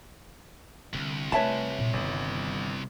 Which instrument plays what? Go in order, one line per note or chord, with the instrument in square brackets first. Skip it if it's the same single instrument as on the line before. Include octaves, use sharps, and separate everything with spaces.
[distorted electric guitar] C2 [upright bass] D3
[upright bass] A3 [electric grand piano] B4 G#5 [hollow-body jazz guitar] C#5 E5 A5
[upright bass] A#2
[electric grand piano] G1 [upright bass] D#3